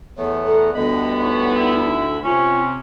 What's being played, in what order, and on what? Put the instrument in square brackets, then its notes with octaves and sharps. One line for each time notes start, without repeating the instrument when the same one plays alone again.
[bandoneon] E2 A3 B3 [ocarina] C#5
[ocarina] A4 [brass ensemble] D5 F#5 A#5
[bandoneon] D2 D3 B5 [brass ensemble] G3 B3 [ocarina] D#5
[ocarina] D#4 [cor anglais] C#5
[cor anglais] E4
[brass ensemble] C3 [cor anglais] C#4 [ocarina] F4